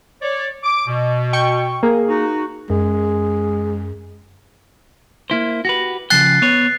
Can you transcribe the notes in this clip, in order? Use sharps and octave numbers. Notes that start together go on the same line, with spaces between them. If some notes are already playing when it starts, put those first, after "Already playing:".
C#5 D5
D6
B2
G5 C#6
A#3 G#4
D#4 F#4
F#2 G#3
A#3 E4 C5
F#4 G4 B4
C#3 F3 G5 F#6 A6 C7
B3 B4 C#5